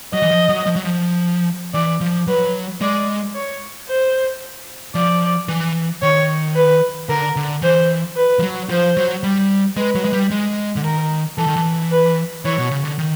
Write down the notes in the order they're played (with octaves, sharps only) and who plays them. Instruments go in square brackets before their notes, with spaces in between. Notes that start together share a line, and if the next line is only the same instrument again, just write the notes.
[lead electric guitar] F#3 [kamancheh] D#5
[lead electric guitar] E3
F3
F#3
F3
F#3
F3
[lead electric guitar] E3 [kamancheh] D5
[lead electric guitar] F3
[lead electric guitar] F#3 [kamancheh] B4
[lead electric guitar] G#3 [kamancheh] D5
[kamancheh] C#5
C5
[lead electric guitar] F3 [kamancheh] D5
[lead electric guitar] E3
[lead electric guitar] D#3 [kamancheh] C#5
[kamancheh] B4
[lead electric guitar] D3 [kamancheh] A#4
[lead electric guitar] D3
[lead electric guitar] E3 [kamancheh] C5
[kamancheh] B4
[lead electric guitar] F3
F#3
[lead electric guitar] F3 [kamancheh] C5
[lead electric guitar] F#3
G3
[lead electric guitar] G#3 [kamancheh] B4
[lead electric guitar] F#3
G#3
G3
G#3
D3
[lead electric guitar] D#3 [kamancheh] A#4
[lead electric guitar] E3 [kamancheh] A4
[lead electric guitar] D#3
E3
[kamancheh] B4
[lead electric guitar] E3 [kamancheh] C#5
[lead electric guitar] B2
C#3
D3
D#3